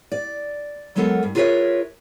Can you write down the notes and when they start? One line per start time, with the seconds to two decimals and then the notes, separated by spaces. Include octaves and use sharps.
0.12 D5
0.96 F#3 G#3 B3 A4 A#4
1.23 G2
1.35 F4 G#4 A#4 B4 C#5 E5